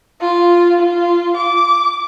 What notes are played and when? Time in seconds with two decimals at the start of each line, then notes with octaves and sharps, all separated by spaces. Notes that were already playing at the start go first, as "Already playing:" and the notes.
0.21 F4
0.79 F4
1.36 D6